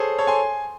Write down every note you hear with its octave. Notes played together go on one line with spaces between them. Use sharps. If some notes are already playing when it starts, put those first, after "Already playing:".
Already playing: G#4 A4 C5 C#5
A4 C#5
G#5 C6